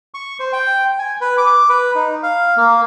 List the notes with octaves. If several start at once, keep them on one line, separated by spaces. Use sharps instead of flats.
C#6
C5
G5
G#5
B4
D6
B4
D#4
F5
A#3